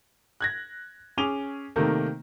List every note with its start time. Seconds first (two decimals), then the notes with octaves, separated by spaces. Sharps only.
0.41 F#6 G#6 A#6
1.17 C#4 G#4 D6 D#7 F7 G7
1.76 C3 D#3 A3 A#3